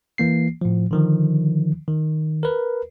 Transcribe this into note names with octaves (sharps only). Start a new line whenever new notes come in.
E3 A#3 C7
A2 F3
D3 D#3 F3
D#3
A#4 B4